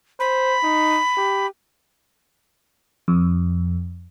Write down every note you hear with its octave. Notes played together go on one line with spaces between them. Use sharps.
C5 B5
D#4
G4
F2